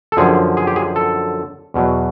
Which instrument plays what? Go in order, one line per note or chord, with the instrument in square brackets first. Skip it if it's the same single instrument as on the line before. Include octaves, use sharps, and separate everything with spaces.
[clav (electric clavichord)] A4
F#2 D3 F3 G#4
G#4
G4
G#4
A4
E2 B2 F#3